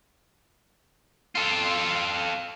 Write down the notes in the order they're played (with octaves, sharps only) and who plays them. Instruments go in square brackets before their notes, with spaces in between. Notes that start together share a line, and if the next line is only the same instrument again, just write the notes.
[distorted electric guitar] F4 A4